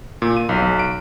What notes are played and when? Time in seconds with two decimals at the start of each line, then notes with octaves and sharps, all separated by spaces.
0.22 A#2
0.37 D#7
0.49 B1
0.62 B1
0.79 D7